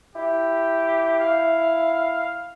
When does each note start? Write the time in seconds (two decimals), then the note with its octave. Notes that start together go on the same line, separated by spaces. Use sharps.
0.15 E4 G4
1.20 F5